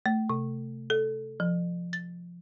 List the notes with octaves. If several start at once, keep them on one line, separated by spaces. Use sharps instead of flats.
A3
C3
A4
F3
A6